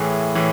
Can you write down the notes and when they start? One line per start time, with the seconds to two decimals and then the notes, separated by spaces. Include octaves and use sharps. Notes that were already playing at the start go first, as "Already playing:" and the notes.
Already playing: A2 E3 G#4
0.35 A2 E3